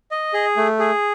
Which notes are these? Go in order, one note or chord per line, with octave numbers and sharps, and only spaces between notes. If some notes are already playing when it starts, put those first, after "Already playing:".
D#5
G#4
A3
G#4